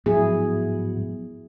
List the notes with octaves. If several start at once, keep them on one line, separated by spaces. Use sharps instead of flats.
G#2 F3 F#3 B3 E4 G#4